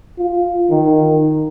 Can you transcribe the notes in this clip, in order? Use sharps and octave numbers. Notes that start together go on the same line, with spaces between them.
F4
D#3